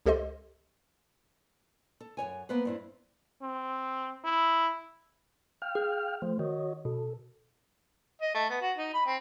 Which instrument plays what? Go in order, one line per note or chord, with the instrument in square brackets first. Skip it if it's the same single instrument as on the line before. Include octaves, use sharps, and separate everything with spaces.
[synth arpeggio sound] C#2 G4 A4 C5 D#5 C6
[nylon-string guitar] A4
F#2 C#3 C#5 G#5
A#3 B3 B4 C5
G2 C4 E4
[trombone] C4
E4
[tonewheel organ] F5 G5 F6
[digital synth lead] G#4
[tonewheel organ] F3 A3 C5
[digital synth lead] D#3 [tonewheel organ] F#4 C#5 D#5
[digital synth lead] B2 [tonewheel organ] A4
[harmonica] D#5
A3
B3
F#4
D#4
B5
C4